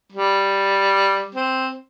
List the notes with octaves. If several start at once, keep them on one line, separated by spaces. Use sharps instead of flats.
G3
C4